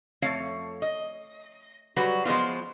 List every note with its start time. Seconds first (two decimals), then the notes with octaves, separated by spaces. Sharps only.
0.22 F2 A3 C#5 F5
0.82 D#5
1.96 F#3 G3 F#4 B4
2.25 F3 G#3 A#3 B3 F4